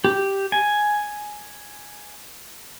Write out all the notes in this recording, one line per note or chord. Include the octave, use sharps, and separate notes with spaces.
G4
G#5